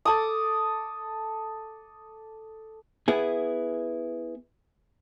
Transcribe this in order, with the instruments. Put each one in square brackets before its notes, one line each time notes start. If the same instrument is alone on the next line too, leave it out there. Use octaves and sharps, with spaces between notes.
[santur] A4 A5 D6 D#6
[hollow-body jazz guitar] B3 E4 G#4